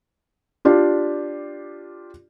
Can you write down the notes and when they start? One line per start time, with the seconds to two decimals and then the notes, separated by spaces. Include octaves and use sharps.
0.65 D4 F4 G4